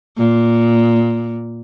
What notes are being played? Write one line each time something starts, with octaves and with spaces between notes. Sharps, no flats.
A#2